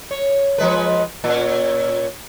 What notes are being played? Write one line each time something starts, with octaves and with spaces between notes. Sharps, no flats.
C#5
F3 G#3 B4
A#2 C#4